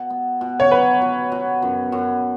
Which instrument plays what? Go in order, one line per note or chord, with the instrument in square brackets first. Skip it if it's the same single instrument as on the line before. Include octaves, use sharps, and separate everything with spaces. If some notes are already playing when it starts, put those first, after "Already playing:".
Already playing: [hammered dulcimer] B2
B3
B2
[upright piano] C#5
[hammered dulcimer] F#3 [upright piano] B4
[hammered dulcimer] B2
B2
F#2
F#2